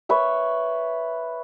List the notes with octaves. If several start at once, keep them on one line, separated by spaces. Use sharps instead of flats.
B4 C#5 E5